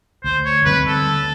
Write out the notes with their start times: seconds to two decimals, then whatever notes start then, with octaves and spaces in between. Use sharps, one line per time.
0.24 D2 C5
0.45 C#5
0.65 D3 G3 C4 B4
0.87 A4
1.07 D2